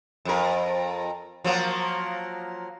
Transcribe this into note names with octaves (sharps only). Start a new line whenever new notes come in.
F2 A#4
F3 F#3 A#3